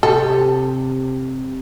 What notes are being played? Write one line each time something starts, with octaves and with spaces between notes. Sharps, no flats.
C3 A4